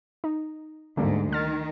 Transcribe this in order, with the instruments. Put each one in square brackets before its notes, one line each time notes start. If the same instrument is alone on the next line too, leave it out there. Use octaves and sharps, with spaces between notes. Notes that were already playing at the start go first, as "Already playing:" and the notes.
[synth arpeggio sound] D#4
[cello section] D2 G#2 [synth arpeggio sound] D3 G3 A#3
[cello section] D#3 [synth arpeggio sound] F6 A6